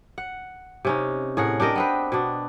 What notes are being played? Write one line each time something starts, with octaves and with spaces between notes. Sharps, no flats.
F#5
C3 C#4 D#4
A2 G#4 A#4 F#5
D4 G4 A#4 D#5
B3 C4 B4
B2 D4